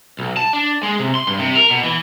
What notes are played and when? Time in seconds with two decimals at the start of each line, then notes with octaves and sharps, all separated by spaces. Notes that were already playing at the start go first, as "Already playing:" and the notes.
0.19 B1
0.37 A5
0.53 D4
0.83 G#3
1.00 C3
1.15 C6
1.27 G2
1.39 C3
1.55 A#4
1.71 B2
1.84 E3